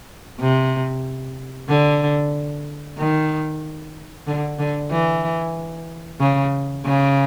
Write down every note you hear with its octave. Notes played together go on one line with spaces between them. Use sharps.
C3
D3
D#3
D3
D3
E3
C#3
C#3